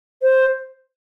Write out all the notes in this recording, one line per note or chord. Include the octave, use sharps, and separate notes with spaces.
C5